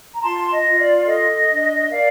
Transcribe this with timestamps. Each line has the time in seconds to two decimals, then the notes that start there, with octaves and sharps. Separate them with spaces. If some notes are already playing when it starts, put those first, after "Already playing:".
0.14 A#5
0.23 F4 A5 C6
0.51 D#5
0.65 F4
0.79 D5
0.98 D5
1.07 A4 D#5
1.49 D4
1.91 A#4 D5 F5